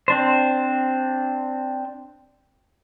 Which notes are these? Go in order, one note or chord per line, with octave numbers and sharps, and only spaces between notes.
C4 D4 C5